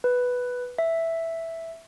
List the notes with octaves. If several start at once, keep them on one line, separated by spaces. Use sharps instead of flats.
B4
E5